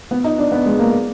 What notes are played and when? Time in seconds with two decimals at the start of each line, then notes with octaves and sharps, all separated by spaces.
0.11 B3
0.24 D#4
0.38 D4
0.52 B3
0.66 G#3
0.79 A#3